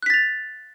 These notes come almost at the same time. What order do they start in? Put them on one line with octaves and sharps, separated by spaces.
F#6 B6 A6 F7